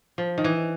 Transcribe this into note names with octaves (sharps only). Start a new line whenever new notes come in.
F3
D#3
E3